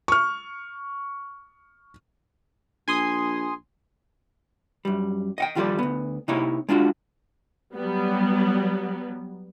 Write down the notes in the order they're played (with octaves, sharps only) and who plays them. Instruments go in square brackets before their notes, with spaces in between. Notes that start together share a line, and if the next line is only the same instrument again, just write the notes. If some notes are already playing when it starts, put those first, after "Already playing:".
[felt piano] C#6 F6
[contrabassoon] A#1 [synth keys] G#5 C6 D#6
[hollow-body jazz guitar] F#2 G3
D#5 F#5 G5
D#2 F3 G3 F4 A4 D5
D2 B3
C3 A#3 D#4 E4 C#5
G#3 D4 F4 F#4
[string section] F#3 G3 B3